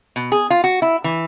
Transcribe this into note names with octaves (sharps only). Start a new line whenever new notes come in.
B2
G#4
F4
F#4
E4
E3